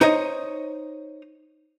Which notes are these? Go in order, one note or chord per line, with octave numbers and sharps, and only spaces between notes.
D#4 C5 C#5 D#5